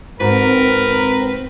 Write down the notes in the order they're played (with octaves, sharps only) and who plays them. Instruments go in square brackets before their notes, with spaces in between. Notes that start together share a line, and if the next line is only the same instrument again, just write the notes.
[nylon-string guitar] G#2 F#4 [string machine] C4 [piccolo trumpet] A#4 [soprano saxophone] B4